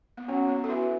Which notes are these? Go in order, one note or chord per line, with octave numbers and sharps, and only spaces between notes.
B3
F#3 C#4
B3
A4
E3 F#4